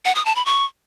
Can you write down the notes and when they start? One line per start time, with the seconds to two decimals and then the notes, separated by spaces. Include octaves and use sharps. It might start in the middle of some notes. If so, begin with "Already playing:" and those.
0.05 F#5
0.15 D#6
0.25 A5
0.36 B5
0.46 C#6